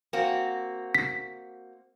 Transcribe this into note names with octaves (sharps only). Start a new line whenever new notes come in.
A#3 C4 F#4
B6